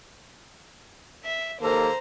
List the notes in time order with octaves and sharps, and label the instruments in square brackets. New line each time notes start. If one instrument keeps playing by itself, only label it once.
[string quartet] E5
[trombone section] D#2 A#3 A4 [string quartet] C5 A#5